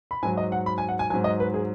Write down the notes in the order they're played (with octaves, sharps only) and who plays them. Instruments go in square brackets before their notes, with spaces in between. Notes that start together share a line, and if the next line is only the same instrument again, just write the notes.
[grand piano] B5
G#2 F#3 G#5
D#5
F#5
B5
G#5
F#5
G#5
F#3 G#5
G#2
D#5
B4
G#4